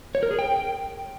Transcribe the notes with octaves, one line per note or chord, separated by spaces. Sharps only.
C#5
A#4
G#4
G5